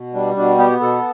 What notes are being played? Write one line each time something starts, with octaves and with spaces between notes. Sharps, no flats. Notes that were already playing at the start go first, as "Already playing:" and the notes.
Already playing: B2
G3 D4
B2 D4
B3 G4
B2 A4